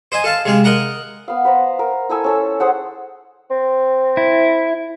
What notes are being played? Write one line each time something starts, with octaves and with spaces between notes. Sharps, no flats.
C5 D#5 G#5
A4 F5 A5
C3 G#3 F5
A#4 D#5 F#5 A#5
B3 F5
B4 C5 A#5
A#4
E4 A4 G#5 E6
C#4 A4 C5
G#4 C5 F#5
C4
E4